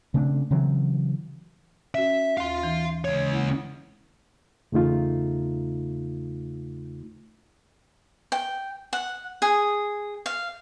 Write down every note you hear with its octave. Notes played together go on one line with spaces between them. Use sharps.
C#3 A3 C4 D4
C#3 E3 F#3 C4
C#4 F#4 E5
D#2 F5 C6
E3 D#4
C#2 C#5
A#3 E4 F#5
E2 C#3 A3 D#4 F4
G5
F#5
G#4
F5